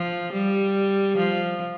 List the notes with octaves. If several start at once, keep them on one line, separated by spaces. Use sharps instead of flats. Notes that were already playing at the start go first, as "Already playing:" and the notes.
Already playing: F3
G3
F3